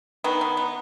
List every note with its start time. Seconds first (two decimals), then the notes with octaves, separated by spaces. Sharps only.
0.24 D#3 B3
0.41 D#3
0.57 B3